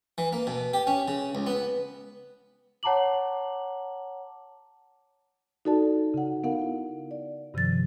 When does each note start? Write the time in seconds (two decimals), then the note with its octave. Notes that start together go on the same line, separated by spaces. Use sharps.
0.18 E3
0.33 A#3
0.47 B2
0.74 G4
0.87 C#4
1.08 C#3
1.35 C#2
1.47 B3
2.83 C#5 F#5 A5 A#5 D6 F#7
5.65 D#4 F#4 A4 D5 A5
6.14 C#3 F#5
6.44 B3 D#4 A#4 F5 F#5
6.62 E4
7.11 D5
7.54 G2 C3 D#3 F3 A6